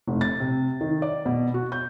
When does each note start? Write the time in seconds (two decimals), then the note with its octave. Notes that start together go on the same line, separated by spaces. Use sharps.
0.08 F1
0.21 A6
0.40 C3
0.81 D#3
1.02 D5
1.26 B2
1.54 F#4
1.72 G6